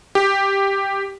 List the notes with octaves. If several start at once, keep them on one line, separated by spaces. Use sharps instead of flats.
G4